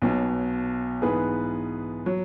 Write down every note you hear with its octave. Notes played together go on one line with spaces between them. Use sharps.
B1 B2 F#3
G#2 E3 B3 G#4 B4
F#3